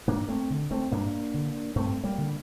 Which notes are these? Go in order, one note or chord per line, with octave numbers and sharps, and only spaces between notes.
G2 A#3 D4
A3 C4
D3
A3 C4
G2 A#3 D4
D3
G2 A3 C4
G3 A#3
D3